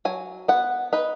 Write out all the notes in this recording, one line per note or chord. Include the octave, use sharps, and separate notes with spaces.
F#3 G#5
B3 F#5
D#4 B4